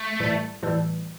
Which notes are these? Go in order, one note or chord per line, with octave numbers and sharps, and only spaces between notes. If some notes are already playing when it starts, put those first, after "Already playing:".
Already playing: A3
A2 E3 G3
A2 E3 G3